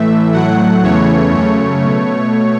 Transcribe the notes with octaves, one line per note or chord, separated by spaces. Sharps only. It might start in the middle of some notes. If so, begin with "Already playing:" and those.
Already playing: A2 E3 A3 E5
A2 F#3 A3 F#5
E2 C#3 E3 A3 C#5
F#2 C#3 A3 C#5
B2 A3